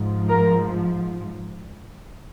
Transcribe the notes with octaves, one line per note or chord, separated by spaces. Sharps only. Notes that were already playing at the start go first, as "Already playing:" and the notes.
Already playing: G#2 F3
A#4